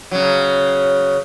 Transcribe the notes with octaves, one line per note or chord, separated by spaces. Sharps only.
C#3 F#3